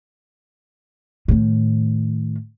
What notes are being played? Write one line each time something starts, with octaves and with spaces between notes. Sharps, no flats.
A2 D#3